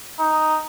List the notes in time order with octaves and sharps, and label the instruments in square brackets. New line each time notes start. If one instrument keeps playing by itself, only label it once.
[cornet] D#4